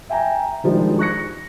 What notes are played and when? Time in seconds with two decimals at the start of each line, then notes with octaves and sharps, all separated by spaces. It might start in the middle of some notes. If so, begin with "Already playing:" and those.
0.09 E5 G5 G#5 A#5
0.64 D#3 F3 G3 G#3 D4 D#4
0.99 C#6 F#6 A#6 C#7